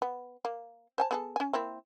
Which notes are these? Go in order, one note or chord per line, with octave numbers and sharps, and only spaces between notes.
B3
A#3
C5 G#5 A5
B3 G#4 A4
C#4 G#5
A#3 C4 E4